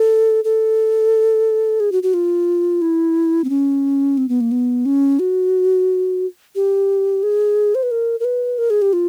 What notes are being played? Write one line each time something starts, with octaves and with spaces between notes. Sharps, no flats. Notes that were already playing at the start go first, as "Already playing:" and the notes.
Already playing: A4
A4
G#4
F#4
F#4
F4
E4
C4
C#4
C4
B3
A#3
B3
C#4
F#4
G4
G#4
C5
B4
A#4
A#4
B4
A#4
G#4
G4
F4